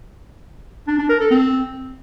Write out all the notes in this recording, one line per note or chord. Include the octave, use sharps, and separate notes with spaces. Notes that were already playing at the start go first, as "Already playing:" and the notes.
D4
D4
A#4
A4
C4